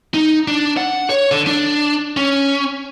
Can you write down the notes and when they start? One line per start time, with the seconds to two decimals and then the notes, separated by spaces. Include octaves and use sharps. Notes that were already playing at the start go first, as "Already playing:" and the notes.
0.14 D#4
0.48 D4
0.77 F#5
1.10 C#5
1.31 D3
1.47 D4
2.17 C#4